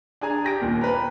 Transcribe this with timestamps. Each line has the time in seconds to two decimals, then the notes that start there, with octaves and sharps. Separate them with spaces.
0.21 D4 G#4 G#5 A#5
0.44 G4 A#6 D7
0.61 D#2 A#2
0.81 B4 G5 A#5